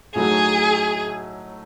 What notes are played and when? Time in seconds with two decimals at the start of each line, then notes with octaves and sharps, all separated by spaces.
0.15 A2 F#3 A3 D#4 F#4 G#4